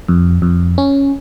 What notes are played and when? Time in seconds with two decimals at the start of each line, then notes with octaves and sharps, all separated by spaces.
0.08 F2
0.42 F2
0.78 C#4